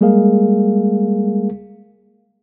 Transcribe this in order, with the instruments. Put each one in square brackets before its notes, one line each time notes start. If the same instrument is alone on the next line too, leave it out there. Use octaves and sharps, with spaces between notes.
[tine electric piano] G3 G#3 A#3 G#4 A#4 F5